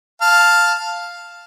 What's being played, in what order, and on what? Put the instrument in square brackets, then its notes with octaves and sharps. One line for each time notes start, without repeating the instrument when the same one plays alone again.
[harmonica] F5 A5